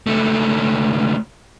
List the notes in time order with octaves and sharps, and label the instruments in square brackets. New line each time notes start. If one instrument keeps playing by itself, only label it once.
[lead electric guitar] C#2 A3